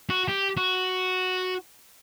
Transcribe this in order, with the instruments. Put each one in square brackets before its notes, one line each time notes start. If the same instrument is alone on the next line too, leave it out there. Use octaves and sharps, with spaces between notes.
[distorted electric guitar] F#4
G4
F#4